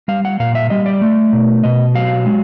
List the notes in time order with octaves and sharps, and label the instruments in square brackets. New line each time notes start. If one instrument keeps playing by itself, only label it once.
[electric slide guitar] G3 F5
F#5
A#2 F5
E5
G3 D#5
D5
A3
B2
B2 D#5
F#3 F5
G#3